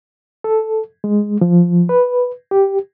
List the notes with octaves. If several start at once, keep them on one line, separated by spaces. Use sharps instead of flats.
A4
G#3
F3
B4
G4